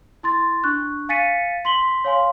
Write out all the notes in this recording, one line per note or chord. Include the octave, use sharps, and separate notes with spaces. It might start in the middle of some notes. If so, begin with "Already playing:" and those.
E4 C6 A6
D4 C#6 F#6
F5 G#5 A6 B6 C#7 D#7
C6 B6 F#7 G7
C#5 F5 G#5 C6